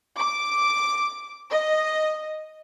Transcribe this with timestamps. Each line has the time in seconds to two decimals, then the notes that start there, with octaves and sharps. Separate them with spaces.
0.17 D6
1.51 D#5